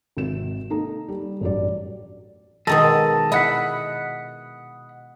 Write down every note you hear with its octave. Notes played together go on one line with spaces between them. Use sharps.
G#1 C3 E7
A#3 D#4 A4 A#5
G3
A1 G2 F#3 G3 D5
B2 D#3 G#3 A4 D#5
E4 D#5 F#5 B5